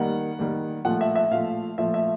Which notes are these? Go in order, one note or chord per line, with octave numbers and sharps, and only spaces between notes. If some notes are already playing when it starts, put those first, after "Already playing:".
Already playing: D#3 G3 A#3 F#5
D#3 G3 A#3
A#2 F3 A3 F#5
E5
E5
A#2 F3 A3 F5
A#2 F3 A3 E5
E5